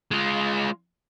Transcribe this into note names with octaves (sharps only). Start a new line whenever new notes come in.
G#3 F4